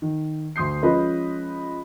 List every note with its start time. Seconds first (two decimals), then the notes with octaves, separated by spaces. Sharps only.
0.02 D#3
0.56 D2 C6 D#6 G6 C7
0.82 F3 G#3 C#4 F4 B4 D#5